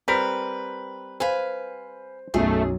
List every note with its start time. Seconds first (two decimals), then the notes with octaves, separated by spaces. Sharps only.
0.08 G3 C4 A#4 B4 B6
1.20 B4 C5 F5 G#5
2.34 B1 F#2 A3 G#4